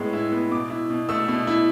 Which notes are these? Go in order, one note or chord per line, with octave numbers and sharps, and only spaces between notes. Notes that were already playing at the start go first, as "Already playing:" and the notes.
Already playing: A2 G#3 B3
E4
B3
B2 D6
E4
B2
A3 E6
B2
E4